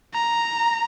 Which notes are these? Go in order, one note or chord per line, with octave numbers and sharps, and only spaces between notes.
A#5